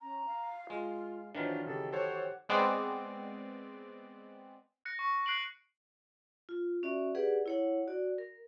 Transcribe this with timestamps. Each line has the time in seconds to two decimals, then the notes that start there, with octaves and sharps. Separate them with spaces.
0.01 C#4 A#5
0.26 F5
0.70 G#3 F4 F5
1.35 D#3 E3 F#3 D4 F4 C5
1.67 C#3 G4 A4
1.92 A4 C5 C#5 F#5
2.49 G#3 B3 C4 D5
4.85 F#6 A#6 C#7
4.99 C#6
5.26 F#6 C7 D7 F#7
6.49 F4
6.83 C#4 F#4 D5 E5
7.15 G4 G#4 B4 D5 F#5
7.46 E4 C#5 F#5
7.87 F#4 D5
8.18 A#4